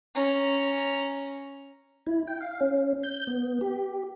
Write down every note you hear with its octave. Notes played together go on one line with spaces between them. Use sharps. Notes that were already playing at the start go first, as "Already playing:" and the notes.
C#4 A#5
E4
G5
F5
C#4
G6
B3
G4